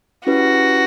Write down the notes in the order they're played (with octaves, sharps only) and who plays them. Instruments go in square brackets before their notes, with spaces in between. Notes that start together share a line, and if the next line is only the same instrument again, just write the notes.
[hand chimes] C#4 E4 G4 B4 [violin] F#4